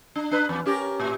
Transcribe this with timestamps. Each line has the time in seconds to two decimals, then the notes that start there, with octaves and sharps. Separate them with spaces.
0.16 D4
0.31 D4 B4
0.49 E2
0.66 C#4 G4 A#4
1.00 A2